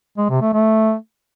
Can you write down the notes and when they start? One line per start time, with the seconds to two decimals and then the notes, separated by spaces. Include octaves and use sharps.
0.17 G#3
0.29 C3
0.41 A3
0.53 A3